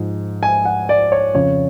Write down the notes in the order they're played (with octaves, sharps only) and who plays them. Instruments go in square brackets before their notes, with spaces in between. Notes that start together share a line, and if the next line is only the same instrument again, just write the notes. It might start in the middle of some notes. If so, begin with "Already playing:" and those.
Already playing: [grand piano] G#2 F3
G#5
F#5
D5
C#5
F2 C#3 F3 C#5